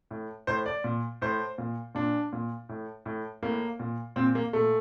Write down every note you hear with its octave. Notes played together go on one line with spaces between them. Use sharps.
A2
A2 C5
D5
A#2
A2 C5
A#2
A#2 D4
A#2
A2
A2
A2 A#3
A#2
A#2 C4
A#3
A#2 A3